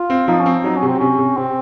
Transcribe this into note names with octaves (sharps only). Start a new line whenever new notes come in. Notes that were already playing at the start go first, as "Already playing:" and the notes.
Already playing: F4
C4
F3 D#4
C#4
C4
F#3 D#4
C#4
C3
C4
C3 C#4
C3
C3 C4